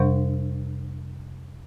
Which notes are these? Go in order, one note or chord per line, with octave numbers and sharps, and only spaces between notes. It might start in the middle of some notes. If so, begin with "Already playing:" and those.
Already playing: F2 C3 G3 D4 C5